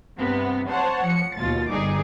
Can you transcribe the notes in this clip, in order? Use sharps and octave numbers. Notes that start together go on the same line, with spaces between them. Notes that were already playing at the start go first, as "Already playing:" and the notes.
G2 C3 B3 C4
C5 C#5 F#5 A5
F3 C#7
D#2 B2 F4 A6
G1 G3 D#4 G#4 D6